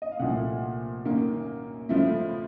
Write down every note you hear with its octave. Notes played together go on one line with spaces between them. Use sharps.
D#5
F5
C2 A#2 F3 A3 F#5
F#2 D#3 A#3
C#2 C#3 F3 A3